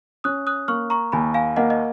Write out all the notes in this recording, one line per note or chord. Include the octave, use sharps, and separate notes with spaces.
C#4 D#6 F#6
D#6 F#6
A#3 C#6 F6
A#5 C#6
D#2 G#5 B5
F5 G#5
A#3 D#5 F#5
D#5